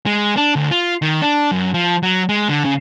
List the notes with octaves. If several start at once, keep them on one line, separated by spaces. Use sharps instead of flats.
G#3
D4
D2
F4
D#3
D4
F#2
F3
F#3
G#3
D3
C#3